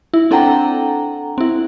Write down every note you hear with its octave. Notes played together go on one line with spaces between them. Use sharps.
E4
C4 D4 A4 F#5 G5 A#5
C4 E4